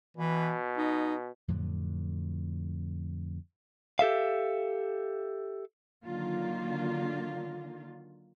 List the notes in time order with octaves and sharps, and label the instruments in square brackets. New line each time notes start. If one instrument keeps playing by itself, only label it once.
[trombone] B2 [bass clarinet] E3
[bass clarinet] D#4
[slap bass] F2 A2 D3 F#3
[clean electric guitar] G4 A4 E5 F5
[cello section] D3 D#3 F#3 A#3 F4